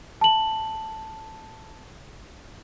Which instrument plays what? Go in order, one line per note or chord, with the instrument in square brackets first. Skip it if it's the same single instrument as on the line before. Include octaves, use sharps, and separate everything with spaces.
[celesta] A5 F#7